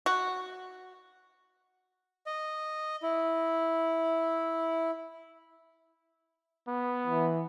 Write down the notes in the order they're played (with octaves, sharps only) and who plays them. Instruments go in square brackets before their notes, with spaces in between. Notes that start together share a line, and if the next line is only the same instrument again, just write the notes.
[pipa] F#4
[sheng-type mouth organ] D#5
E4
[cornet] B3
[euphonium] E3